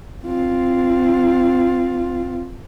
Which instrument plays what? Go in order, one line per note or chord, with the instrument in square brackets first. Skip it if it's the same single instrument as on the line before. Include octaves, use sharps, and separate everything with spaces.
[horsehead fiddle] C4 F4